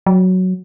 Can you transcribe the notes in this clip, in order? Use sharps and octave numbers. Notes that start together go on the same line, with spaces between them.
F#3